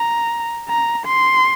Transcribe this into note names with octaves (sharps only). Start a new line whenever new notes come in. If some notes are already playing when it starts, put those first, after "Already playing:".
Already playing: A#5
A#5
C6